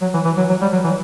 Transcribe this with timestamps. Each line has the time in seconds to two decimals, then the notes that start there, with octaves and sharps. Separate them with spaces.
0.02 F#3
0.14 E3
0.25 E3
0.37 F#3
0.49 F#3
0.61 G3
0.72 F#3
0.84 E3